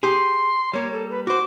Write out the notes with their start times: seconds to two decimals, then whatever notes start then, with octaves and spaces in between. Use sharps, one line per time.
0.03 G4 G#4 C6
0.73 G3 A#3 C#5
0.93 A4
1.11 B4
1.27 F#4 C5 D6